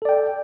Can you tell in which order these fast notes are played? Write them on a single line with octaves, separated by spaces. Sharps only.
A4 D5 G5